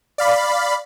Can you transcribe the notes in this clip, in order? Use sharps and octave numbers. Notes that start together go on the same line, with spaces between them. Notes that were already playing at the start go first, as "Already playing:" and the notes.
D5 F5 B5